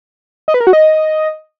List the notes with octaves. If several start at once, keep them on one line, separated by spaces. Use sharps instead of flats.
D#5
B4
A#4
F#4
D#5